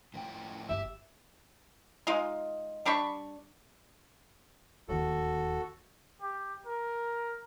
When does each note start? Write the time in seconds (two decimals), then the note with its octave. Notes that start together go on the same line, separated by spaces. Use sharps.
0.14 A2 F3 G5
0.69 G1 G4 E5
2.07 G#3 D#4 F4
2.85 G3 D4 B5 C#6
4.89 D1 D#2 D#3 F#4 A4
6.21 G4
6.66 A#4